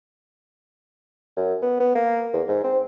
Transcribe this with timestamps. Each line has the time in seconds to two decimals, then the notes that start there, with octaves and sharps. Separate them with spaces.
1.37 F#2
1.62 B3
1.80 B3
1.95 A#3
2.33 E2
2.48 G#2
2.64 C4